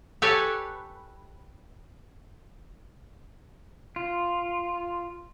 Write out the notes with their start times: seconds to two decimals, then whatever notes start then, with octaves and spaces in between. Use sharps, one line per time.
0.22 G4 A4 B4 C#5 G#5
3.96 F4